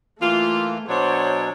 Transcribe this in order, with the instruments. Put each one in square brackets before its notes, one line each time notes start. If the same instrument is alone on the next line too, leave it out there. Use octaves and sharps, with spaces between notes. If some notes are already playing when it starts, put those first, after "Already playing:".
[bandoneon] E3 A#3 [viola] A3 [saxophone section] F4
[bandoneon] B2 F#3 [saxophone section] D4 C#5 [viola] C5